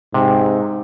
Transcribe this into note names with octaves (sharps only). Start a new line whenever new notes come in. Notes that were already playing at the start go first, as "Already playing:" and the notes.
G#2 C3